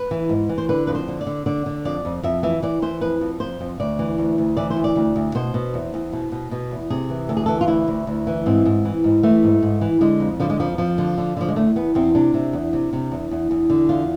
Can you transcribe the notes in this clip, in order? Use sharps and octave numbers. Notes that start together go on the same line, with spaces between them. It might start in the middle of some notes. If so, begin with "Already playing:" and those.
Already playing: B4
E3
G#2
E3
C5
D3 B4
F2 B4
C5
D3
D5
D3
D3 D5
D3
F2 D5
F2
F2 E5
E3 E5
E3 D5
E3 C5
F2 B4
F2
F2 C5
F2
D2 D5
E3
D2
D2
E3 D5
C5
D2
D5
D2
D2
B2 C5
B2
E2
E2
B2
B2
B2
E2
C3 G#4
E3
D2 A4
G#4
E3 A4
F4
D2 E4
D2
D2
E3
G#2 C4
G#2
E3
G#2
E3 A3
G#2
G#2
E3
D3 G#3
F2
D3 F3
G#3
F2 F3
F2 F3
D3
D3
D3 F3
G#3
E2 A3
E2 B3
E2 C4
C3 D4
C3
E2
C3
C3
E2
E2
E2
D3
E2 F4